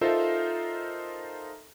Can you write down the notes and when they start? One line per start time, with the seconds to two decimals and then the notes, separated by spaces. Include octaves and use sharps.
0.01 D#4 F4 A4 A#4 C5 E5